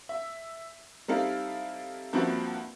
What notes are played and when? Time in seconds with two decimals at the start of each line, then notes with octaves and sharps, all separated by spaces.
0.09 E5
1.08 G3 C4 D#4 E4 A4 F5
2.13 G2 F3 A#3 C4 E4 F#4